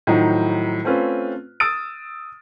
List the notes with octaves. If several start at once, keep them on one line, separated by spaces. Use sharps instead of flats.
A2 D#3 F3 F#3 D#4
A3 C4 C#4 F4 B4
D#6 E6 A6 D7